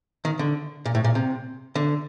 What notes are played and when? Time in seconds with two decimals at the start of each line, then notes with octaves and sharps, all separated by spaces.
0.25 D#3
0.39 D3
0.85 A#2
0.95 A2
1.04 A#2
1.15 C3
1.75 D3